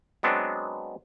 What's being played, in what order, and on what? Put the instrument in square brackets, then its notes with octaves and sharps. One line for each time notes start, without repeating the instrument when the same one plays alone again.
[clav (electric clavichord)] F#3 G#3 B3 C4 D4